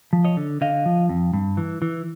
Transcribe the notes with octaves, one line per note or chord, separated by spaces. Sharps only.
F3
C#5 D#5
D3
D3 D#5 F5
F3
F2
G2
E3
E3